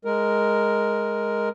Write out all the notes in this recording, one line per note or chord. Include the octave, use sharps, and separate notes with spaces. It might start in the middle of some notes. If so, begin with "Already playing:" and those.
G#3 A#4